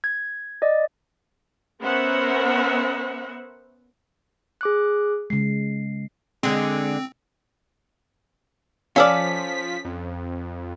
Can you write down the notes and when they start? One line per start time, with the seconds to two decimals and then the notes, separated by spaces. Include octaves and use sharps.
0.04 G#6
0.62 D5 D#5
1.80 B3 C#4 A#4 C5 E5 F#5
4.61 G#4 D6 F#6
5.30 C#3 G#3 C7
6.43 D3 G#3 C4
8.96 F3 C#4 A4 D5 F5 E6 F6 B6
9.85 F2